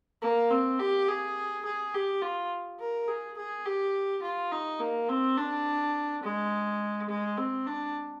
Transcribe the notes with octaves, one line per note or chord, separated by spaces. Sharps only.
A#3
C4
G4
G#4
G#4
G4
F4
A#4
G#4
G#4
G4
F4
D#4
A#3
C4
D4
G#3
G#3
C4
D4